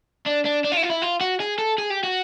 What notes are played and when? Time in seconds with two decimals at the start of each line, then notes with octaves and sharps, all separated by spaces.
0.26 D4
0.45 D4
0.64 D4
0.72 F4
0.77 E4
0.83 F4
0.90 E4
1.02 F4
1.21 F#4
1.40 G#4
1.58 A4
1.78 G#4
1.90 G4
2.03 F#4